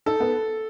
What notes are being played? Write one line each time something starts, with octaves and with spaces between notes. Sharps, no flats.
D#4 A4
B3